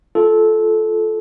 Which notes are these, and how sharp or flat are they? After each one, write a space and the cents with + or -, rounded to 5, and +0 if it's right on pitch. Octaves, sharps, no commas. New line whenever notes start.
F4 +0 A4 -15